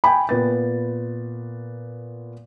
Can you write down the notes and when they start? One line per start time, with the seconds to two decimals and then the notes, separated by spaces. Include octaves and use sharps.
0.04 G5 G#5 B5
0.29 A#2 B3 A6